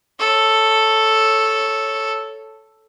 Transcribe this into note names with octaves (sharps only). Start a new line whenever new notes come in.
A4 C#5